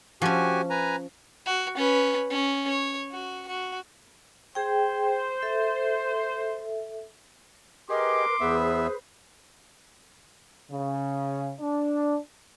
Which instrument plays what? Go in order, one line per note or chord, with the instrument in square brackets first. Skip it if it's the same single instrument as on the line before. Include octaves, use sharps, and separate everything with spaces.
[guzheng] F3 C#4 [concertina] F#4 G4 G#5
[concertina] B4 G#5 A#5
[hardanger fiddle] F#4
C#4 B4
C#4
C#5
F#4
F#4
[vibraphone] G#4 G5 [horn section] C5
[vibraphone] A4 E5
[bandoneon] G4 G#4 [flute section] A#4 B4 [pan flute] D#5 [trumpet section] C6 D6
[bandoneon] E2 B3 E5 [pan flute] G#4 [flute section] B4 C5
[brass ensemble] C#3
D4